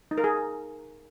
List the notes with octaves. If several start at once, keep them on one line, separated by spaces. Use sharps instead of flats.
D#4
A#4
G#4